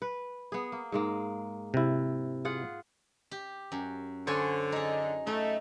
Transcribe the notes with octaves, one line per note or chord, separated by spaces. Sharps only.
B4
B3 G#4
A#3
G#2 G#3 A#3
C3 E4
F4 G#4 F#5
G4
F#2
D3 C5 C#5 G#5
D#4 G#4
A3 D#4